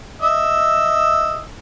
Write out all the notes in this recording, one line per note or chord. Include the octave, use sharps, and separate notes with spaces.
D#5 E5 E6